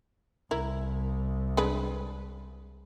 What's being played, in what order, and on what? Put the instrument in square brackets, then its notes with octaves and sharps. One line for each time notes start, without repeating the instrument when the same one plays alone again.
[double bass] C2 [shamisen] E4 A#4
[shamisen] G#3 D4 B4